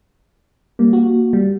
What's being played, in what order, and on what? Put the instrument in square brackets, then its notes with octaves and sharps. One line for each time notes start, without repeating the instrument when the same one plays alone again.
[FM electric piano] G3 [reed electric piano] A#3
[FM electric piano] F#4
G3